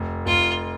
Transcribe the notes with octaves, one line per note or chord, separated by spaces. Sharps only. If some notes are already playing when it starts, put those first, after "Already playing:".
Already playing: F1
F1 F4